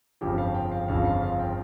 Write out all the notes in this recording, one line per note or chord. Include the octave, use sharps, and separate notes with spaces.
G1 F2 C#3 F3 G4
F5
G5
F5
G1 F2 C#3 F3 F5
F5
F5
G5